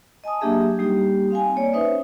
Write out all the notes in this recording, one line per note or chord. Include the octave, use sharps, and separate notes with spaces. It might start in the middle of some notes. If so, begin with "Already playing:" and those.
D#5 G#5 A5 D#6
F#3 A#3 D4 G4 G#4 E5
G3 A#3 D#4 G4
C4 F5 G5 G#5
A#3 C#5 D5
C#4 D#4 B4 C5 E5 D#6